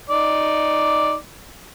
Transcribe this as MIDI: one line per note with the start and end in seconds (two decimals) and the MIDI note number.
0.10 1.14 63
0.10 1.14 74